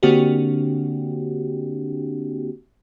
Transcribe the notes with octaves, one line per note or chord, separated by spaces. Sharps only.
D3 A#3 C4 D4 F#4 G4